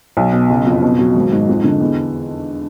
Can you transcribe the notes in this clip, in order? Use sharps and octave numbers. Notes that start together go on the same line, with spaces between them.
B1
B2
F#1
F2
B2
F#3
G#1
G#2
F2
D3
E2